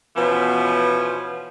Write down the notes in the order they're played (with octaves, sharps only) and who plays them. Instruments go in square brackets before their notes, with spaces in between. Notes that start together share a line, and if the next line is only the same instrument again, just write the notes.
[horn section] B2 E3 F3 B3 C#4